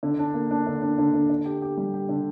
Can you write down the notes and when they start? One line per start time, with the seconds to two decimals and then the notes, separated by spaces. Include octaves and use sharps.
0.03 D3
0.19 D4
0.34 A#3
0.51 D4
0.67 D3
0.82 D4
0.98 D3
1.14 D3
1.30 D3
1.46 G4
1.62 G4
1.77 G3
1.94 G4
2.09 D3